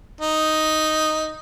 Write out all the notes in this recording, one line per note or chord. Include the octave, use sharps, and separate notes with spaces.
D#4